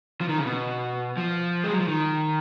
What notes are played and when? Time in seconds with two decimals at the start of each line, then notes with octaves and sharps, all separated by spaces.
0.21 F3
0.29 D#3
0.38 C#3
0.46 B2
1.17 F3
1.64 G#3
1.72 F#3
1.80 F3
1.88 D#3